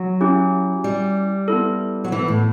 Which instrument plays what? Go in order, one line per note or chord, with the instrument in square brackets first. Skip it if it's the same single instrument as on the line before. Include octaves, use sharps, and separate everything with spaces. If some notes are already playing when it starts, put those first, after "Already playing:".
Already playing: [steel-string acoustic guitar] F#3
[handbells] C#4 E4 G4
[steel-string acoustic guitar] G3
[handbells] B3 E4 A4
[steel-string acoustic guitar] F#3
E3
A2